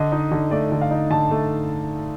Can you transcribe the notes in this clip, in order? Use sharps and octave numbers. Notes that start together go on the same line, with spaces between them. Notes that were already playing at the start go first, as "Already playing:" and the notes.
Already playing: D3 D#5
D#4
D3
A3 D5
D3
F5
D#4
D3 A5
A3